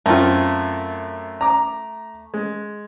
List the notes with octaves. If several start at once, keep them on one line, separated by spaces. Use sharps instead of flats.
F#2 A3 C4 F4
A#5 D6
G#3